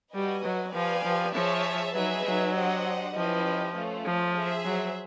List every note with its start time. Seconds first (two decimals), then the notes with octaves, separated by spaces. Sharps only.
0.14 G3 F#4 B4 D#5 G#5
0.45 F#3
0.74 F3 G4 B4 D5 F5 G#5
1.04 F3
1.34 F3 G#4 C#5 E5 A5
1.95 F#3 D#4 G#4 B4 E5
2.25 F#3
2.54 D4 G4 C5 D#5 F#5
3.15 F3 C#4 E4 G4 B4 D#5
3.75 A3 C#4 F4
4.05 F3
4.35 G#4 C5 E5
4.65 F#3